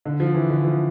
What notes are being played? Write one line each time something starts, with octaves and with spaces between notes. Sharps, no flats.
D3
F3
E3
D3
F3